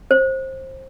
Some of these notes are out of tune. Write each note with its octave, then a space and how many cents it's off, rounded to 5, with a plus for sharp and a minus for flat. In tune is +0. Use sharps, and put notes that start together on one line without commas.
C5 +20